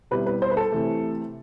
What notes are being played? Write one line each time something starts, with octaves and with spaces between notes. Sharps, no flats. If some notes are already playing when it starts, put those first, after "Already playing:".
B2 G3 C4 E4 B4
B4
C5
B4
A4
C3 E3 A3